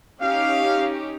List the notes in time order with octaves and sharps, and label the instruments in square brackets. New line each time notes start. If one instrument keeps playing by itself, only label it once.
[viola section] C#4 D#4 G4 [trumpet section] F5